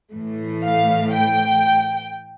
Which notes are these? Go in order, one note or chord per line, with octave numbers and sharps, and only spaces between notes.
A2 E3 A3
F5
G5